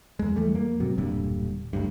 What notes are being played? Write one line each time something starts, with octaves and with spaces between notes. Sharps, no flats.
E2 G#3
E3 G3 A3
F2 A#3
G#2 C3 F#3
E1 G2 A#2 D3
G1 D2 G2